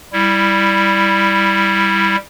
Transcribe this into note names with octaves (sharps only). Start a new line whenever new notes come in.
G3 E4